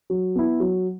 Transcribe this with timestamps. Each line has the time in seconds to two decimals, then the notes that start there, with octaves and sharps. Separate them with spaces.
0.10 F#3
0.35 B3 E4
0.60 F#3